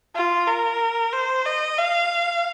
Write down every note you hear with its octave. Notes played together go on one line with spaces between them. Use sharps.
F4
A#4
C5
D#5
F5